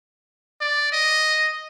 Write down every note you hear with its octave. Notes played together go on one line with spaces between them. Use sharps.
D5
D#5